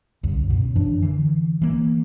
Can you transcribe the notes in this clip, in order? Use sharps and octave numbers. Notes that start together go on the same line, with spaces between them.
C2 F#2 D3
F#2 B2
F#2 E3 D4
D3 E3
E3 A#3